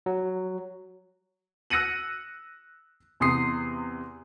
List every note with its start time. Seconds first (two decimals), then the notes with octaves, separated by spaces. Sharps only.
0.06 F#3
1.70 E6 F#6 A#6 C#7 D#7 F#7
3.20 E2 C3 C6 D#6 C7